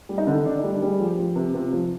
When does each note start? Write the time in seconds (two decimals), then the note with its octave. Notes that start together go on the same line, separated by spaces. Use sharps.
0.09 G3
0.18 D#4
0.27 D3
0.46 D3 D4
0.59 G3 D#4
0.73 D4
0.82 G3 G#4
1.00 F3 G4
1.18 F3
1.36 C3
1.54 C3 F4
1.73 F3